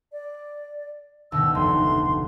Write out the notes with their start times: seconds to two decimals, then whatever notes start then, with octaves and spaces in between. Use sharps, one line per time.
0.12 D5
1.32 D2 B2 D#3 E6
1.55 F1 C6